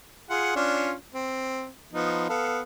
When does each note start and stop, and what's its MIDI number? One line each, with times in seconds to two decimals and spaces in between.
0.30 0.51 65
0.30 0.51 68
0.30 0.51 78
0.56 0.93 61
0.56 0.93 62
0.56 0.93 65
1.14 1.69 60
1.93 2.26 53
1.93 2.26 59
1.93 2.26 63
2.29 2.61 59
2.29 2.61 69
2.29 2.61 77